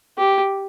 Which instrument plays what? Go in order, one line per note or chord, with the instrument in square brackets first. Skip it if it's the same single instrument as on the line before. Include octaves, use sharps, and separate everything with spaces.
[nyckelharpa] G4